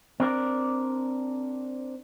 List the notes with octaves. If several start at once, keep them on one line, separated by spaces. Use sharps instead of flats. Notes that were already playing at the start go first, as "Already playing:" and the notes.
C4 D4 A#4 D5